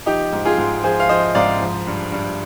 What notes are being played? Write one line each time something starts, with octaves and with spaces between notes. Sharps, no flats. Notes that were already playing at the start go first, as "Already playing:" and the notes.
F3 D#4 G4
G#2
F4 G#4
G#2
F3 G#4 C5
F5
F3 C5 D#5
G#2 D5 F5
F3
G2
G2